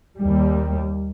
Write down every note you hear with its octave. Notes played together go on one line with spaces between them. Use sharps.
D#2 G3